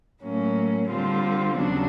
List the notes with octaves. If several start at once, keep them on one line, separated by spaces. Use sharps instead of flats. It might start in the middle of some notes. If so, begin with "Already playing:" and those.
A2 F#3 A#3 C#4
D3 G3 C4 F4
D#2 C#3 F#3 B3 D4